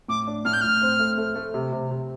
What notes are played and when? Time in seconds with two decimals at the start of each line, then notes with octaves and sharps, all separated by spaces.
0.08 A2 D6
0.27 D4
0.45 A2 F6
0.53 G6
0.61 A2 F6
0.82 C4
0.99 A3
1.18 A3
1.35 A3
1.54 C3
1.72 C3
1.91 C3